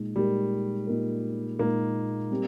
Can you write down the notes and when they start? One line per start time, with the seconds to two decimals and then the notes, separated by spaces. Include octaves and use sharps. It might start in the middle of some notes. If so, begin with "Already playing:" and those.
Already playing: A#2 G#3 D#4
0.16 A#2 G3 G#3 D#4 A#4
0.87 A#2 G#3 D#4 A#4
1.59 A#2 G#3 A#3 D#4 A#4
2.31 G3 C4